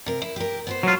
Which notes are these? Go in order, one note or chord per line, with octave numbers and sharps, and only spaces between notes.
C3 A#4
E4
G4 A#4
B3 B4 C5
F#3 F4